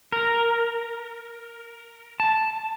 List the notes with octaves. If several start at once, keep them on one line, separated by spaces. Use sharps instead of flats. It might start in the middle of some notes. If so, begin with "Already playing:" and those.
A#4
A5